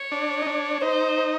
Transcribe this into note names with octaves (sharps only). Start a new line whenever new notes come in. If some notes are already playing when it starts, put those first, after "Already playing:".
Already playing: C#5
D4
D#4
D4
D#4 C5